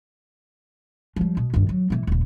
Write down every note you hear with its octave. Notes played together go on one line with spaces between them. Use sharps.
F3 G3
B2
G2 D#3
F#3
B1 E3
D#1 C#3